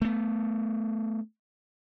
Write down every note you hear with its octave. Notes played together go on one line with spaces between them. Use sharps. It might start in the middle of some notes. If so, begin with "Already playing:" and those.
A3 B3